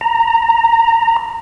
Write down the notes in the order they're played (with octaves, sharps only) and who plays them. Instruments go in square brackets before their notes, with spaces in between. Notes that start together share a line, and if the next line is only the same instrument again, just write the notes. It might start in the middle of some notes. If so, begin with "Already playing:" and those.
[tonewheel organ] A#5